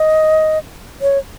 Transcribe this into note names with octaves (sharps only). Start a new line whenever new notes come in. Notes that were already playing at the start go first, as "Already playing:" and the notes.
Already playing: D#5
C#5